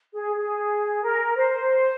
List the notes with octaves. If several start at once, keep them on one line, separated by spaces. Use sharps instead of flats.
G#4
G#4
A#4
C5